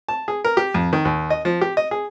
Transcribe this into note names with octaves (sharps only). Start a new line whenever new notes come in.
A5
G#4
A#4
G4
F2
D#3
D#2
D#5
F3
G4
D#5
G#4